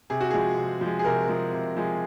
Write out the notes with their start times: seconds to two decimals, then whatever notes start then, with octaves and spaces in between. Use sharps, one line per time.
0.10 C3 G#4
0.21 F#4
0.31 F3 G#3 G#4
0.57 C3
0.81 F3 G#3
0.99 G#4
1.04 C3 A#4
1.29 F3 G#3
1.53 C3
1.76 F3 G#3